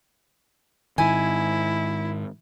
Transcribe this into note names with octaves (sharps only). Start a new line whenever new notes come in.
G#2 D#3 E4 G#5